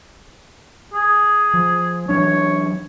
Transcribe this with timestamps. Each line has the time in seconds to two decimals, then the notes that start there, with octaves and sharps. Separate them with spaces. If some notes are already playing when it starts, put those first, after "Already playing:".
0.94 G#4
1.54 F3
2.09 E3 F#3 D4 C#5